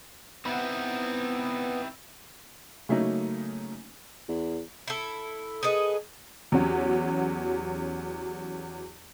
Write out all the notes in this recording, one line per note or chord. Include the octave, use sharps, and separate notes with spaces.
B3 C4 D#4 E4
C#3 F#3 A3 A#3 C#4 D#4
E2
E4 A4
G#4 A4 B4 D#5
E2 F#3 C#4 F#4 G4